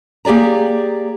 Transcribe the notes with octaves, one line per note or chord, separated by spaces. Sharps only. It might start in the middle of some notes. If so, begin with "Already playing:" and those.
A#3 G4 G#4 D5 A#5